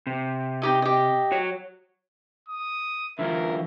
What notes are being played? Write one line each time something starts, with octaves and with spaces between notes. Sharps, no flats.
C3
D#4 G4 D#5
G4 D#5
F#4 C#5
D#6
D3 E3 F4 A#4 E5